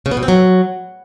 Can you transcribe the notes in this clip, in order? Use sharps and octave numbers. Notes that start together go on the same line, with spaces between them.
C#3
B3
B2
C4
F#3